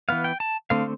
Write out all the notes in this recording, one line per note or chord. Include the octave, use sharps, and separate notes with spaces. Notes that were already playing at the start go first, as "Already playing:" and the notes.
E3 B3 F5
G5
A5
D3 A3 C4 F5